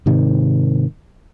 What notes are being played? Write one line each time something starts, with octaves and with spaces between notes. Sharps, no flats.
G#2 C3 D#3